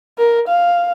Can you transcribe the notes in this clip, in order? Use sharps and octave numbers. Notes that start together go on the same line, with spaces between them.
A#4
F5